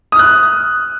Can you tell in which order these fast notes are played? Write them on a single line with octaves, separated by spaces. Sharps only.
D#6 F6 F#6